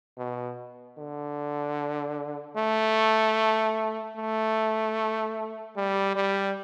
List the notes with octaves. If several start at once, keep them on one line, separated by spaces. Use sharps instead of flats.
B2
D3
A3
A3
G3
G3